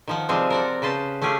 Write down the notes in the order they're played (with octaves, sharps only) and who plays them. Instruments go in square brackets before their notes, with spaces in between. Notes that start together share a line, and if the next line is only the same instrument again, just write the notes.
[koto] D#3 F3 F#5
C3 F3 G3 G#3 C4
A#4 D5 F#5
C#3 B4 C5 A5
A3 C#4 F4 G4 G#4